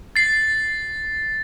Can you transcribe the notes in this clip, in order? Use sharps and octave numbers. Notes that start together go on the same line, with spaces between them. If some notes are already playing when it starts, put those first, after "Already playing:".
A6 C7